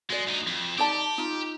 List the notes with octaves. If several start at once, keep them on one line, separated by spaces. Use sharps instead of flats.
G#3 F#4 D5
D2 D#4
F2
D#4 G4 D5 A5
D#4 F4